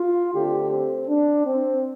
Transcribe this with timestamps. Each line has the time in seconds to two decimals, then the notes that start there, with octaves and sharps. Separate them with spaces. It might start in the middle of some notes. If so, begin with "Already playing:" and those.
Already playing: F4
0.33 D3 A3 C4 G4
0.70 C4
1.07 D4
1.45 C4